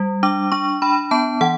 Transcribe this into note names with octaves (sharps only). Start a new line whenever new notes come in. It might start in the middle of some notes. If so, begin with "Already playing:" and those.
Already playing: G3
D4 D6
D4 C#6
D4 B5
B3 A5
E3 F#5